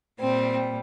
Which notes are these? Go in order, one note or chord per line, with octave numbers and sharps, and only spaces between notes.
A#2 G3 C4